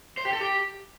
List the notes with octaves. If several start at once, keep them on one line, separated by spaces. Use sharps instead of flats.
C5
G4
A4
G4